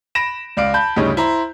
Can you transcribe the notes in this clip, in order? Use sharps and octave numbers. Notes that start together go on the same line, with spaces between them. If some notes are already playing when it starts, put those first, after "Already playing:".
B5 A#6 D7 E7
C#2 D5 F5 D7
A5 B5 G6
D2 G2 C#3 D#4 C#5
E4 C5 A#5